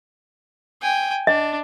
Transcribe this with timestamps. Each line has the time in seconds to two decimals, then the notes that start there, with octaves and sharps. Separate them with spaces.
0.82 G5 G#5
1.27 D4 D#5